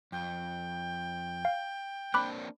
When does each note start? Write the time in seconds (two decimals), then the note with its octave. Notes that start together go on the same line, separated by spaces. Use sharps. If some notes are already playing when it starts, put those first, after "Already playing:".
0.12 F2 G5
1.45 F5
2.14 A#3 C4 D4 B5 D6 F#6